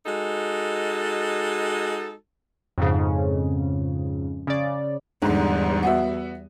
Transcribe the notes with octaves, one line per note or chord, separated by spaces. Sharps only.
G#3 D#4 F#4 A4
F2 G#2 C#3
C#3 D5
E2 G#2 D3 G3
B3 F#4 E5